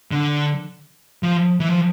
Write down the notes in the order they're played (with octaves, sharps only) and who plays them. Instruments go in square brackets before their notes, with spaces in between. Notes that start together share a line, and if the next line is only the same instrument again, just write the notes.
[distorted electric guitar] D3
F3
E3
F3